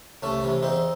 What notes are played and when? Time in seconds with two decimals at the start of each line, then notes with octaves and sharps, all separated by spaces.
0.22 C2 A3 C#4
0.43 C3 E3
0.63 E2 C4 D#4